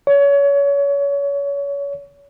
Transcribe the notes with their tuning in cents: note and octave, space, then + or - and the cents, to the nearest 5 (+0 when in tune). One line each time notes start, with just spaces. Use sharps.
C#5 +30